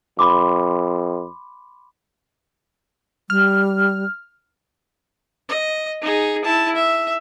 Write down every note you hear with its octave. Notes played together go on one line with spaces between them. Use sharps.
F2 B5 C6 D6
G3 F6
D#5
D#4 G#4
E4 A5
E5